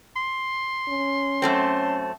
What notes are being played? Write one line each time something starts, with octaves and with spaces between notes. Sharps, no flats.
C6
C#4
F#2 A3 C4 A5